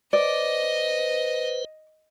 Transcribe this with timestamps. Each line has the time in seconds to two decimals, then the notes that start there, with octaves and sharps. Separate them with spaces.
0.13 B4 C5 D5 D#5